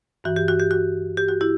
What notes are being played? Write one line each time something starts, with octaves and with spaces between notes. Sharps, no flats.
G2 E3 F#4
G4
F#4
G4
F#4
G4
F#4
E4 G4